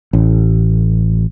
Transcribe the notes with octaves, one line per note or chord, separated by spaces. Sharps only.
A1